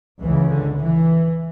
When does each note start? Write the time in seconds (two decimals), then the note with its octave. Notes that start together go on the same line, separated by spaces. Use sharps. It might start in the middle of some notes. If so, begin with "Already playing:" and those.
0.21 C#2 C#3 E3
0.50 D3
0.79 E3